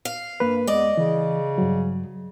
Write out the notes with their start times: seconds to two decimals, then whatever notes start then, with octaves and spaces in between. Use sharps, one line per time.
0.05 F5
0.40 G2 A#3 B4
0.67 E2 G#3 D5 D#5
0.97 C#3 E3
1.58 G2 F#3